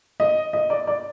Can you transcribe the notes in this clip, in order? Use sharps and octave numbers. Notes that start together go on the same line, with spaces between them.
D#5
D#5
D5
D5